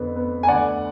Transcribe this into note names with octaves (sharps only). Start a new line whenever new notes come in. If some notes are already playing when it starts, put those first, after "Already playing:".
Already playing: F2 D3 B3
B3
G#5
D2 D5 F#5